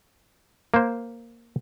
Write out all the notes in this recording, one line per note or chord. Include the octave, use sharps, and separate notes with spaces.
A#3 C5